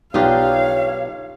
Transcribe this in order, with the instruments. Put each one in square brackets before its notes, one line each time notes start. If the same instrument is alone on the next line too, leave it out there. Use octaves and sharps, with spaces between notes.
[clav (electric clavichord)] B1 D4 [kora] D#4 F4 G4 [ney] C#5 [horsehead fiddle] F5